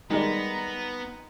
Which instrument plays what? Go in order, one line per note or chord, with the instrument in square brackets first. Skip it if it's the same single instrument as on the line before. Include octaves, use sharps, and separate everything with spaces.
[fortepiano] D#3 G#3 [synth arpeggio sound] G3 A#4 D5 [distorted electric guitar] B3 [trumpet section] A#5